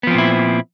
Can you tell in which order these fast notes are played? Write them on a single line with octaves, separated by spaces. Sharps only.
B3 F3 C4 A#2 E4